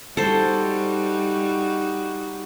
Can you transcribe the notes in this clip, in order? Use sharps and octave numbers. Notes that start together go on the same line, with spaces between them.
G3 D#4 F#4 A4 C5